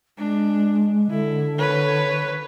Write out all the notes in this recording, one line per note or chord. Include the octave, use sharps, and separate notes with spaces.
G#3 D4
D3 E4
B4 C#5